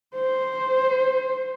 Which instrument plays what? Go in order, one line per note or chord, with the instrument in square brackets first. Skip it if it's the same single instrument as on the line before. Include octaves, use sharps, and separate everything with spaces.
[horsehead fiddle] C5